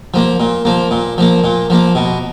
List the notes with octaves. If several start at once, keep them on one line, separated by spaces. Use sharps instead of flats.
F3 A#3
A#2
F3 A#3
A#2
F3 A#3
A#2
F3 A#3
B2